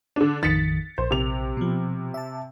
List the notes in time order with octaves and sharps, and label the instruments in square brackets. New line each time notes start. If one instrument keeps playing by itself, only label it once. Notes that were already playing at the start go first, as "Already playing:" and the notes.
[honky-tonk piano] D3 D4
[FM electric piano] A1 F2 D#3 [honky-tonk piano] A6 B6 C#7
[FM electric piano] A#1 [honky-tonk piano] C5
[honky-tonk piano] C3 F7
[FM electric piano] B2 F3
E5 A5